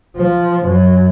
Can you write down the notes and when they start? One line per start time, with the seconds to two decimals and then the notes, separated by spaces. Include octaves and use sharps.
0.17 F3
0.65 F#2